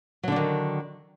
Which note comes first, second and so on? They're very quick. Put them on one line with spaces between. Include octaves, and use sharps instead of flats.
F#3 D3 D4 D#3